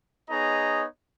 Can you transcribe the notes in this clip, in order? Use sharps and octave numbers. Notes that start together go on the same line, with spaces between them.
B3 D#4 G#4 C#5 D#5 A#5